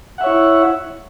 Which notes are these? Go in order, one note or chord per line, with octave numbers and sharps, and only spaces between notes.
E4 C#5 E5 F#5